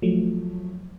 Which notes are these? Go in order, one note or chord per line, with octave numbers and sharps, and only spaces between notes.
F3 F#3 A3